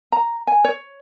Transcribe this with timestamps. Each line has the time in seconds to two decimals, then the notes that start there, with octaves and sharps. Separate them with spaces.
0.12 A#5
0.47 G#5
0.64 C#5